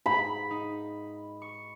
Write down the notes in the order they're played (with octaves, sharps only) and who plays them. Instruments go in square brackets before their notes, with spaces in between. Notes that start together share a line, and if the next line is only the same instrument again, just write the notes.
[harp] G#2 [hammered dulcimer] B5
[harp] D#4
C#6